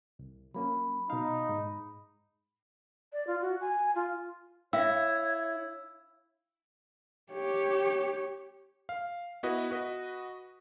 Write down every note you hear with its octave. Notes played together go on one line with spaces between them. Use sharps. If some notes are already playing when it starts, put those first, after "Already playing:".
C2
F#3 A#3 C#4 B5
B2 D#4 F5
G#2
D5
F4
F#4
G#5
F4
E4 C#5 E5 F5 G5 E6
G4 C#5
F5
B3 E4 F#4 B4 D#5
F#4 B4 D#5